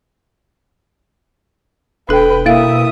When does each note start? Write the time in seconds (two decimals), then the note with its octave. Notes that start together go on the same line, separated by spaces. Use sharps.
2.09 E1 D4 A4 B4 G5
2.46 B2 A#3 E4 A#4 E5 F5 D#6